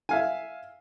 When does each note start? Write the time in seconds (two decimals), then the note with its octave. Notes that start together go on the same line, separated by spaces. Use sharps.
0.09 E5 F5 G#5